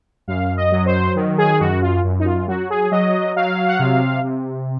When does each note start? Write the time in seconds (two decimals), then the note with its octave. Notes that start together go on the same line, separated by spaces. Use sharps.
0.28 F#2 F5
0.57 D#5
0.72 F#3
0.86 C5
1.16 D#3
1.38 G#4
1.60 F#2 F#4
1.82 F4
2.04 F#2
2.20 D#4
2.25 F4
2.48 F#3 F#4
2.70 G#4
2.91 F#3 D#5
3.36 F#3 F5
3.68 F#5
3.79 C3 F5
4.23 C3